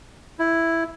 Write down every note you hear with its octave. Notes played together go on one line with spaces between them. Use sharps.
E4